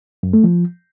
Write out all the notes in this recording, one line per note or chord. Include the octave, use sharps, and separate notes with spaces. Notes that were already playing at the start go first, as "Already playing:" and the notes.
F#2
A3
F3